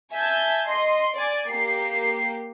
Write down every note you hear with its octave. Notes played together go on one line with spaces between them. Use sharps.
E5 G#5 A5 G6
D#5 C6
D5 G#5
A#3 G4 C7